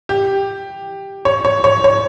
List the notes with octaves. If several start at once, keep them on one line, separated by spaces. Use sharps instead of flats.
G4
C#5
C#5
C#5
C#5